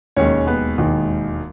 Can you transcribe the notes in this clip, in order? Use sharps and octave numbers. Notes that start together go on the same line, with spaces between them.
E1 D#2 D#3 G#3 C#4 C#5
B3 B4
E1 D#2 D#3 G#3